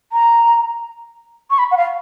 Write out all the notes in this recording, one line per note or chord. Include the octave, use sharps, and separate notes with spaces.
A#5
C#6
B5
F#5
F5